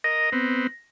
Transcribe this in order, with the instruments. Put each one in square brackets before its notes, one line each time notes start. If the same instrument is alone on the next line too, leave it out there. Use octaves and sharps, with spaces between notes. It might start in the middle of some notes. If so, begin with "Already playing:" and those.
[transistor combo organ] A#4 D#5 [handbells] A#6
[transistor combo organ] B3 C4